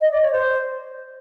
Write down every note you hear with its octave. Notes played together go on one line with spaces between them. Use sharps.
D#5
D5
C#5
C5